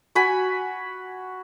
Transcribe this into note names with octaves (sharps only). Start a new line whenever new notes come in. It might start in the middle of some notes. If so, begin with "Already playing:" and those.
F#4 G#5 B5